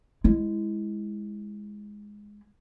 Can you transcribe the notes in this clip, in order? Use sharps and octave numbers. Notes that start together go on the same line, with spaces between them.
G#3 E4